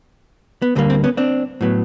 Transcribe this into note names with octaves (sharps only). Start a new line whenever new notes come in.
B3
D2 D3 G3 A#3 C4
C4
B3 C#4
C4 D4
A2 F#3 B3